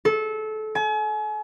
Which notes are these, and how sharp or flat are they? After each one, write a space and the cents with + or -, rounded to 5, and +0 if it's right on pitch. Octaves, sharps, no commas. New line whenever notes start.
A4 -25
G#5 +40